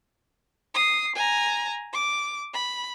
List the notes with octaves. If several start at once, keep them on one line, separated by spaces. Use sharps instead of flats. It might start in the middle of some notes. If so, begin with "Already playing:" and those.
D#6 C7
G#5 A#5
D6
B5